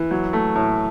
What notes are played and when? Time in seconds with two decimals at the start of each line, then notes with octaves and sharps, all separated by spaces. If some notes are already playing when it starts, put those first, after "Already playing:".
Already playing: E3
0.11 F#3
0.33 A3
0.55 A2